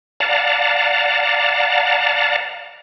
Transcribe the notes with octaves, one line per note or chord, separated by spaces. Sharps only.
D5 F5 F#5 A5 A#5